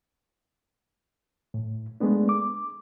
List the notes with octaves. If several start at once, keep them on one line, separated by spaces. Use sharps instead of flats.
A2
G#3 A3 B3 D4
D6